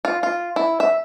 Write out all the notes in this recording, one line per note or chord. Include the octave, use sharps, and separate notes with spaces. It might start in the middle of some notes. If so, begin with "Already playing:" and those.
F4
F4
E4
E5